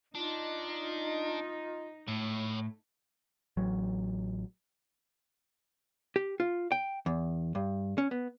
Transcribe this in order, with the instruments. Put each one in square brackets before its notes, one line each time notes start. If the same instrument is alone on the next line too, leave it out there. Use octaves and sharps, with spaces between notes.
[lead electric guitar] D4 [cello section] D#4 [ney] F4
[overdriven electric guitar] A2 [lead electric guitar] C#5 E5
[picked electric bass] A1 F#3
[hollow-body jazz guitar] G4
F4
G5
E2
G2
C#4
B3